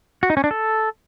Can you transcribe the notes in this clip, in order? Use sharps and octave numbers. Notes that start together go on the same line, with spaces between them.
F#4
D#4
C#4
D4
A4